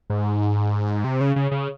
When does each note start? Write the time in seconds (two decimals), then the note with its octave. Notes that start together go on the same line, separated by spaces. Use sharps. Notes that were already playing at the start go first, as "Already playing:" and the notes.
0.10 G#2
1.04 C3
1.21 C#3
1.36 C#3
1.51 C#3